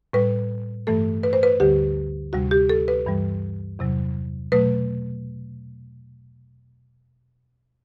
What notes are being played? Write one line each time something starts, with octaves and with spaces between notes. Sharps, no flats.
A2 G3 B4
G2 E3 A3 A4
B4
C5
B4
D2 D3 G3 G4
D2 C3 G3 F#4
G4
A4
B4
G2 E3 G3
E2 C3 F#3
B2 F#3 A3 B4